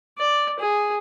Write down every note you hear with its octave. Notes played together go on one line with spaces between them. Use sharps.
D5
G#4